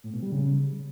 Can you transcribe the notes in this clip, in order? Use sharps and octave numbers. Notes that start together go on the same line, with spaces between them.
A2
B2
G3
C#3